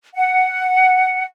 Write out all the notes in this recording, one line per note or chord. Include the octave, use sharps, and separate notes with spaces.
F#5